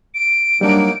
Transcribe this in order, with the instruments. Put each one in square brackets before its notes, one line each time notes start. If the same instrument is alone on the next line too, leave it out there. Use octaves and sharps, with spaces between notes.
[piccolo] D7
[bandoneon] F#3 A#3 D#4 [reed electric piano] G3 D4